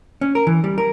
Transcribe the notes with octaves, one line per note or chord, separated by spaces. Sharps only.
C#4
A#4
E3
G3
A#4